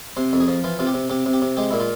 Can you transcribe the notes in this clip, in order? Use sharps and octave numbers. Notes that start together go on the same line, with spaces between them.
C3 C5
F2
G#4
F3
E3 F4
C3 F4
G4
C3
C3 G4
C3
G4
C3
G#3 G4
A#2 E4
F4